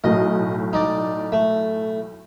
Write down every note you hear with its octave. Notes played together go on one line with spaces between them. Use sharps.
B1 A2 D#5
D#4 D5
A3